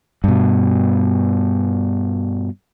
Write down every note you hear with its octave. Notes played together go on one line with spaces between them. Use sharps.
G2 B2